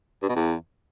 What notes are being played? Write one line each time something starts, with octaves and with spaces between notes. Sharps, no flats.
G2
B2
E2